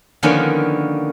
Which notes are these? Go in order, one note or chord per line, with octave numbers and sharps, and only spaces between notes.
D3 D#3 F3 A#3 B3 C#4